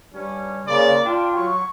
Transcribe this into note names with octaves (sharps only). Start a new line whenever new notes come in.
G2 G3 C#4
C#3 A#3 D5 C6
D4 F4 G5
F#3 C#6